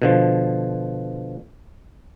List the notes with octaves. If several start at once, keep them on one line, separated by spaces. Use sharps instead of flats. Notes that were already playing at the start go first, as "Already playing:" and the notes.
B2 D3 F3